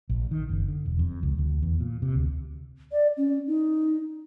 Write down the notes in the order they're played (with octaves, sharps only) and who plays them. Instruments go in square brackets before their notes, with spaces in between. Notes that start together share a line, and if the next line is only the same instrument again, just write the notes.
[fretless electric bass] A#1
D#3
F#1
D3
E1
F2
C#2
D2
E2
A#2
C3
D2
[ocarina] D5
C#4
D#4